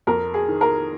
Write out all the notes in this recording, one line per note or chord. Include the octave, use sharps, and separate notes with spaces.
F2 A#4
G#4
D#3
A#4